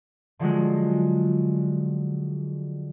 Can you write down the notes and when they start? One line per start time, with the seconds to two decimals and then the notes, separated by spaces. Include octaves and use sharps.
0.39 D3 F3 F#3 G#3